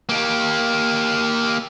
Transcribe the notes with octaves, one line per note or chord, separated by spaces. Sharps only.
A#3 G4